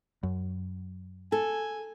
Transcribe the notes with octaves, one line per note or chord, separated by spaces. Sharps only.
F#2
A4 G#5